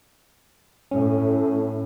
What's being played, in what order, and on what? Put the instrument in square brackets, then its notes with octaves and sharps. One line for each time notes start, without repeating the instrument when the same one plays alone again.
[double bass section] A2 [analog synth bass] C#4